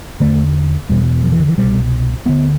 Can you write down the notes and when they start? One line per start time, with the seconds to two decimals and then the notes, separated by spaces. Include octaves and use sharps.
0.20 E2 D3 A3
0.89 E2 B2 G3
1.23 F3
1.32 E3
1.39 D3
1.48 E3
1.58 C2 B2 G3
2.26 D2 D3 B3